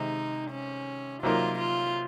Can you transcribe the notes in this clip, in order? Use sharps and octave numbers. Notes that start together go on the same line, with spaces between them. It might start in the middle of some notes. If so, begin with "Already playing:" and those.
Already playing: C3 D#3 G#3 D#4
C#4
C3 F#3 A#3 D#4 F4 A#4
F4